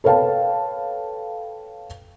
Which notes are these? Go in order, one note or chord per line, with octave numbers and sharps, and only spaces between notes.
A4 B4 C#5 F5 G5 A5